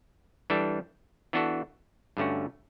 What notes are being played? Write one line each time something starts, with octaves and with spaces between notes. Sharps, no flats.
E3 G3 D4 A4
E3 B3 D4 F#4 A4
G2 D3 A3 C#4 F#4